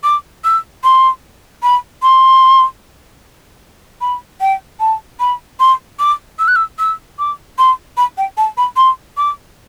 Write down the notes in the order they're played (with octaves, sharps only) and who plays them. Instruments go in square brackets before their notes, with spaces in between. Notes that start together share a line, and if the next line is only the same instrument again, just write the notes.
[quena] D6
E6
C6
B5
C6
B5
G5
A5
B5
C6
D6
E6
F#6
E6
E6
D6
C6
B5
G5
A5
B5
C6
D6